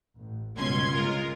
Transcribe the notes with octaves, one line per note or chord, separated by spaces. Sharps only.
A1
G1 C#2 B2 C#4 C6 G#6
G#3 F4 A#4